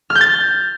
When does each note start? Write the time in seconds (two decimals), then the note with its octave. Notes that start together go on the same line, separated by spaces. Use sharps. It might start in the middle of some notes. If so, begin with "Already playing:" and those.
0.10 F6
0.15 G6
0.21 A6